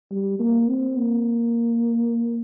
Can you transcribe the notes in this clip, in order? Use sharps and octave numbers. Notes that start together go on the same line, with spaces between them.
G3
A#3
C4
A#3